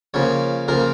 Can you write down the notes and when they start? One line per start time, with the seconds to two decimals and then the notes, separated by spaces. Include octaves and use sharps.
0.14 C#3 F3 A#3 C#5
0.68 C#3 F3 A#3 A#4